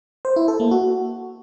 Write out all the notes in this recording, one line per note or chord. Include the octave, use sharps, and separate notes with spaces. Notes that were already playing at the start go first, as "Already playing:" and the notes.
C5
E4
A4
A#3
F#4